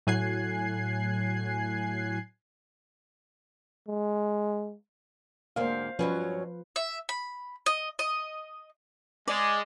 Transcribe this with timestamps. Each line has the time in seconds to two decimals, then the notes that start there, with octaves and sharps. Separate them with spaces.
0.07 A2 F#3 G#5 F#6 G#6 C7
3.88 G#3
5.56 D2 G#2 A#3 C5 F5
5.99 G2 F3 F#3 C#4 B4
6.76 E5
7.09 B5
7.66 D#5
7.99 D#5
9.28 G#3 D5